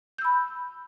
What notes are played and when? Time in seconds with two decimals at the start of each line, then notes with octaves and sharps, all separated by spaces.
0.18 G6
0.22 E6
0.25 B5